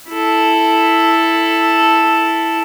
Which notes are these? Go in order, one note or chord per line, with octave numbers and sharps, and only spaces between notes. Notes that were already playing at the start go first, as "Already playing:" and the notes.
E4 A4